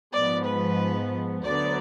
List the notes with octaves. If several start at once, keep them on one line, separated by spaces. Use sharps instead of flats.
G#2 F3 B3 D5
B4
D2 D3 F#3 B3 D5